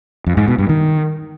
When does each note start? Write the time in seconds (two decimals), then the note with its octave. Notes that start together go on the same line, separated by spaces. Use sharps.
0.26 F2
0.37 G#2
0.48 B2
0.58 G2
0.69 D#3